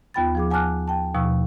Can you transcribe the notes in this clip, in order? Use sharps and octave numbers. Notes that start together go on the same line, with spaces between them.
D#2 B3 F4 G5 B5 A6
F3 G#4 D6
F#5 G#5 A5 D6 F6 F#6
G5 A5
D#2 B2 F3 C#6 E6